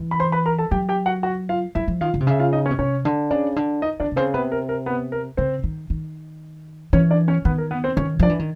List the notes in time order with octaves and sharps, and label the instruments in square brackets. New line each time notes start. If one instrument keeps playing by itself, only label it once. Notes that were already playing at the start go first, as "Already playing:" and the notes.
Already playing: [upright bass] E3
[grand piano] B5
C5 C6
B4 B5
A#4 A#5
A4 A5
[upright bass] F#3 [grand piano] G4 G5
[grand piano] G4 G5
F#4 F#5
F#4 F#5
F4 F5
[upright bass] F#3 [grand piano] E4 E5
[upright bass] F3
[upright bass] D#3 [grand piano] F4 F5
[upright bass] D3
C3
[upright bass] C#3 [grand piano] E5
[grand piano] F4 F5
D#4 D#5
C#4 C#5
[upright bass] B2
[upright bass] C3 [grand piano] C#4 C#5
[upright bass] D3
[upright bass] C#3 [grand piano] D4 D5
[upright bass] D3
[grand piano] D#4 D#5
[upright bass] D3 [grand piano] D4 D5
[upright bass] C3
[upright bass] C#3 [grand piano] C4 C5
[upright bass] C3 [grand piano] B3 B4
[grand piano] A#4
A#4
B3 B4
A#4
[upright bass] C#3 [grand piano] C4 C5
[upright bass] D#3
D#3
[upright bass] E3 [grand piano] C#4 C#5
[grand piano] D4 D5
C#4 C#5
[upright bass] D#3 [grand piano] B3 B4
[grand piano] A#4
B3 B4
C4 C5
[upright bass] D#3 [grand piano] C#4 C#5
[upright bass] F3 [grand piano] D4 D5
[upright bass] E3
D#3